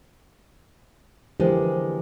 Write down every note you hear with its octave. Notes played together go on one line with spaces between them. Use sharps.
D3 E3 F3 G#3 A#3 G4